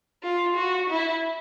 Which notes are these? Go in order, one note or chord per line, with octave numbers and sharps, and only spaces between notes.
F4
F#4
E4